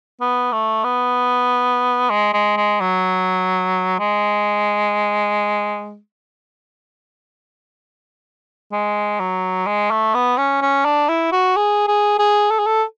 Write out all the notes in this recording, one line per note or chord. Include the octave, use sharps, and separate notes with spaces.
B3
A3
B3
G#3
G#3
G#3
F#3
G#3
G#3
F#3
G#3
A3
B3
C#4
C#4
D4
E4
F#4
G#4
G#4
G#4
A4
G#4
A4